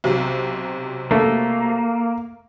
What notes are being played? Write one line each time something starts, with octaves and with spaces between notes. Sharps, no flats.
B1 C3 F#3
A3 A#3